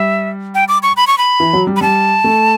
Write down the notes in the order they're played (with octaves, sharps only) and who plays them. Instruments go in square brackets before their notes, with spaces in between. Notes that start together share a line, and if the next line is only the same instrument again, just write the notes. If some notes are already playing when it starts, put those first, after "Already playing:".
Already playing: [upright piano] G3 [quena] E5
[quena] G5
D6
C#6
B5
C#6
B5
[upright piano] E3
F#3
G3
[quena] B5
[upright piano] G3 [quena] A5
[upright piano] A3